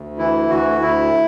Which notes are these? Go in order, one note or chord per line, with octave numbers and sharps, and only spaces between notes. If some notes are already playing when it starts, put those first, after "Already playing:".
Already playing: D2
E3 E4
D2 F#4
D2 E4